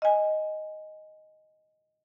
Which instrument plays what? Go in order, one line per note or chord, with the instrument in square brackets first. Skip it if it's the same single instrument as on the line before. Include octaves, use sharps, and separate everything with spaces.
[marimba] D#5 G#5